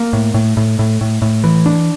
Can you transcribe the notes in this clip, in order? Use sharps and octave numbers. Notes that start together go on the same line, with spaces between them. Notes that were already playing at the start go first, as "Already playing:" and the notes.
Already playing: A#3
A2
A2
A2
A2
A2
A2
E3
D4